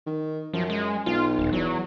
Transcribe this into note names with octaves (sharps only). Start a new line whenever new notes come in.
D#3
F#2 F3
G#3
B1 F4
D#1
E2 F#3